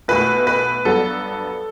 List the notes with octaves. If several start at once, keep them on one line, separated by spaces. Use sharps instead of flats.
B1 B2 A3 B4
B4
G2 F#3 B3 A4